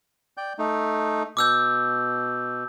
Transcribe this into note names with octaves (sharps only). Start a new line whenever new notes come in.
D5 G5 G6
A3 D#4
B2 D6 E6 G6